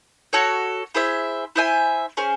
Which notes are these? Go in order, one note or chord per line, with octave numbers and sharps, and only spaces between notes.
F#4 A4 C#5
E4 G#4 C5 E5
E4 C5 E5 G#5
C#4 G#4 C5